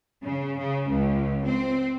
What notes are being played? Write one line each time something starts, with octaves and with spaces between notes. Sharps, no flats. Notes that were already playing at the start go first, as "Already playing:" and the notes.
C#3
C#3
C#2
C4